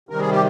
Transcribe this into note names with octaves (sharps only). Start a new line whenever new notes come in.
C3 D#3 G3 A#4
G#4
G4